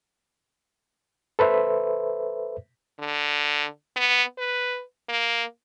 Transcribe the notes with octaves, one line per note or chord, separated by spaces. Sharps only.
A4 B4 C5 E5
D3
B3
B4
A#3